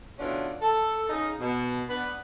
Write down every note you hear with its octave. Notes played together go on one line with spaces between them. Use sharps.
B2 D3 E3 C#4 D4 F4
A4
C#3 D#4
B2
B3 D4 B4